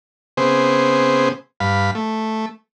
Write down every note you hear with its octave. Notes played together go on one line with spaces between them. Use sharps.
C#3 B3 C4 G#4 C5
G2 F5 B5
A3